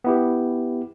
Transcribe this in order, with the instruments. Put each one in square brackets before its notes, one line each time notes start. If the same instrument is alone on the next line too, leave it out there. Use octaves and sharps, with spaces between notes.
[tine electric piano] B3 E4 G4